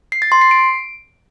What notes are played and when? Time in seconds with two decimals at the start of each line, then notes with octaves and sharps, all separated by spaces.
0.12 C7
0.22 A6
0.32 C6
0.41 C7
0.51 D7